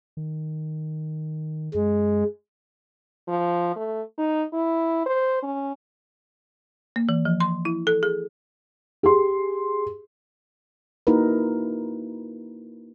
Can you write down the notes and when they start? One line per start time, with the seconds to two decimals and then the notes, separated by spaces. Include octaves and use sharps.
0.17 D#3
1.74 F#2 G#3
3.28 F3
3.76 A3
4.18 D#4
4.54 E4
5.06 C5
5.43 C#4
6.96 A#3
7.09 E3
7.25 F3
7.40 C6
7.65 E4
7.87 A4
8.03 G#4
9.03 G4 G#4 C6
11.07 A#3 D#4 E4 F#4 A#4 B4